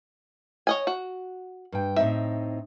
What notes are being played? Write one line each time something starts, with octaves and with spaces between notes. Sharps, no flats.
C#5 D#5 G#5
F#4
G2 G5
A2 C4 D#4 E5